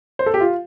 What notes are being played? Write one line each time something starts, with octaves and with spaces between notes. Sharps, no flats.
C5
A4
G4
F4